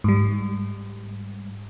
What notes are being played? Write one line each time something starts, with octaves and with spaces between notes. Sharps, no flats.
G#2 G3